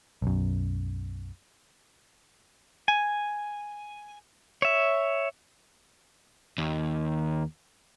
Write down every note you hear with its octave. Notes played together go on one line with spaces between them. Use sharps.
B1 F#2
G#5
C#5 E5
D#2